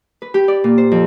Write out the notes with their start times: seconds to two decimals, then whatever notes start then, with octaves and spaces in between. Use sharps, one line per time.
0.22 B4
0.34 G4
0.48 D5
0.64 A#2
0.78 C5
0.92 F2